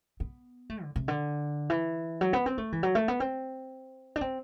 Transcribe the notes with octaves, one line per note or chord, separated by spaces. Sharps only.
B3
A3
D3
C3
D3
E3
F#3
B3
C4
A3
E3
F#3
A3
B3
C4
D4
C4